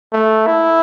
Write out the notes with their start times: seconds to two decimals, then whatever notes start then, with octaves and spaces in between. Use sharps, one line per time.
0.13 A3
0.47 E4